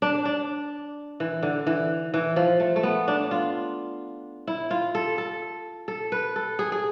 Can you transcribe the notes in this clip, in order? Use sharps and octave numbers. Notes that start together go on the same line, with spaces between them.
D4
D4
E3
D3
E3
E3
F3
A3
A3
B3
D4
F4
E4
F4
A4
A4
A4
B4
A4
G#4
G#4